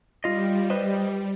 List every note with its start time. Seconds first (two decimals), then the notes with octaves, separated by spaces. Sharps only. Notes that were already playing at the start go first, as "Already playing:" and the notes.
0.24 G3 F4 D#5
0.70 B4 C5 D#5